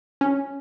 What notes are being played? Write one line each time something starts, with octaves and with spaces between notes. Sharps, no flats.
C#4